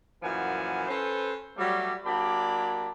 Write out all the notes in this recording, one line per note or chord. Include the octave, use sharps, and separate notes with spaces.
F#2 A#2 E3 F3 F#5 G#5
C#4 A4 B4 C5
F#3 G3 A3
F#3 A#3 D4 G4 D5 B5